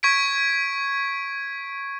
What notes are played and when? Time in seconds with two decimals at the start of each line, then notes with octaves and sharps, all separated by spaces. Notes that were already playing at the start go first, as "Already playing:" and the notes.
0.03 C#6 G#6 B6 D7